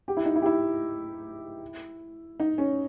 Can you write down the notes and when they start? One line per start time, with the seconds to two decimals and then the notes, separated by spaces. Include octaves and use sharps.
0.08 G4
0.17 E4
0.25 D#4
0.36 E4
0.42 G4
0.46 E4
2.40 D#4
2.58 C#4